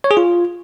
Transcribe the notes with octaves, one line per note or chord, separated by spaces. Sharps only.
C#5
G#4
F4